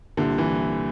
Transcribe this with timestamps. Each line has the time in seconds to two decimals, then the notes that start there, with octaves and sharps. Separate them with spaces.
0.17 C2 A#2 D3 G3
0.38 E3